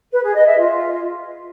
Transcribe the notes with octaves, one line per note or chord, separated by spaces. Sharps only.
B4
G#4
D#5
E5
F4